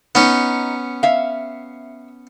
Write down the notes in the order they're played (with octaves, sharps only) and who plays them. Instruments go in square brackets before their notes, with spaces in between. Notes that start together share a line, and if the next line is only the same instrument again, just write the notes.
[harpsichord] B3 C#4 [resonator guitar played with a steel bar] D#4
[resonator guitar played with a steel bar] E5 F5